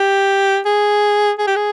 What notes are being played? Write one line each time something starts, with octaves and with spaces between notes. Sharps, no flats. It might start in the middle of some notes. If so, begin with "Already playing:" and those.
Already playing: G4
G#4
G#4
G4
G#4